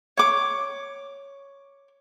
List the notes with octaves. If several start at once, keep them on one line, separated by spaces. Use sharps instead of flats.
C#5 D6